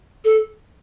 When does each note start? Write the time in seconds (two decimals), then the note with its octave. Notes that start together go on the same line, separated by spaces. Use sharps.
0.24 A4